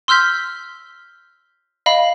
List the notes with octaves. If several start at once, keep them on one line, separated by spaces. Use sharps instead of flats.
C6 E6 F6 G6 B6
D#5 F5 B5